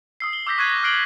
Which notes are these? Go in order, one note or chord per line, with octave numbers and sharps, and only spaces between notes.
D#6 E6 C7
G7
D6 E6 G6 A#6 B6
C#6 F#6 G#6 C7 D#7
A#6
F6 F#6 C7 D7 F#7 G7